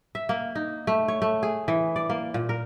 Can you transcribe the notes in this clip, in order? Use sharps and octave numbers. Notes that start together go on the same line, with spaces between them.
E5
A#3
D#4
A3
C#5
A3
G#4
E3
D5
A#3
A#2
A#4